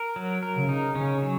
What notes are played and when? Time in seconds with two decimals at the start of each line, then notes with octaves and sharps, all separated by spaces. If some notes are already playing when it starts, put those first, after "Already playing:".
Already playing: A#4
0.16 F#3
0.43 A#4
0.56 C#3
0.69 D#4
0.95 C#3 C#4
1.22 F#3